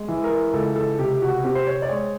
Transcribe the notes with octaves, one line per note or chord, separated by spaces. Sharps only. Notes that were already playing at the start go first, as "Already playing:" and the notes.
Already playing: G#3
E3
A#4
C#2 A4
A4
C3 G4
F#4
C4 G4
C5
C#5
D5
G#3 C#5